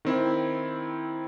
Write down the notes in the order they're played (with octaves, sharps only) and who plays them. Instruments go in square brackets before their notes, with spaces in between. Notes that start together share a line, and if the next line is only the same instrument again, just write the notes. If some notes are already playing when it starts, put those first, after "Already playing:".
[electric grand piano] D#3 C4 E4